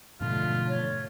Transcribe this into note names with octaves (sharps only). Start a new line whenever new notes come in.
G#2 B2 D3 F3 A3 F4
C#5